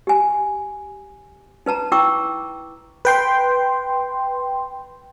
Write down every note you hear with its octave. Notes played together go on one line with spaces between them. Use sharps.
G4 G#5
D#4 B4 A5 A#5
E4 G5 A#5 C#6 D6 E6
B4 G5 C6